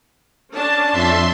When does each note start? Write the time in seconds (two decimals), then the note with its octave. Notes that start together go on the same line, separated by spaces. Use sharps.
0.54 C#4 D4 A5
0.91 F2 E5 C6